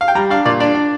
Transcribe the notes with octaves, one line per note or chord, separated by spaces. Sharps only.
F5
G5
G3 A#5
D4 F5
A#2 D5
D4 D5
D4